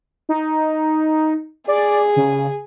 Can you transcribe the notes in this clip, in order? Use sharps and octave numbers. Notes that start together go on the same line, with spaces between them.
D#4
G#4 D5
C#3